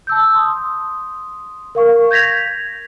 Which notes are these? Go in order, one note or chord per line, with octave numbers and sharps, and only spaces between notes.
A5 E6 G6
C6 D#6
A#4 F5 C#6
G6 G#6 A#6 B6 F7